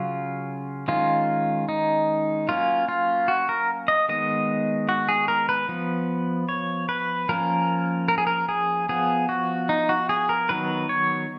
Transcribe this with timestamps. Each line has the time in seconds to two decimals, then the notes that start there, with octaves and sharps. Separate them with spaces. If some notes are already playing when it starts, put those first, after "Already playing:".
Already playing: C#3 F#3 C#4 F4
0.88 D#3 G#3 C#4 F4
1.69 D#4
2.49 F#3 A#3 C#4 F4
2.89 F4
3.28 F#4
3.49 A#4
3.88 D#5
4.09 D#3 G#3 B3 D#5
4.89 F#4
5.09 G#4
5.28 A#4
5.49 B4
5.69 F3 B3
6.49 C#5
6.89 B4
7.29 F3 A#3 C#4 A#4
8.08 A#4
8.18 G#4
8.27 A#4
8.49 G#4
8.89 F3 B3 G#4
9.29 F#4
9.69 D#4
9.89 F#4
10.09 G#4
10.29 A#4
10.49 D#3 F#3 B3 B4
10.89 C#5